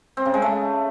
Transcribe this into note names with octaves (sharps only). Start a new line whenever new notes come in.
C4
C#3
G#3
A3